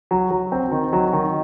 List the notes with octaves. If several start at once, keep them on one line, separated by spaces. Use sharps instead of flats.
F#3
F#3
C4
D#3
F#3
D#3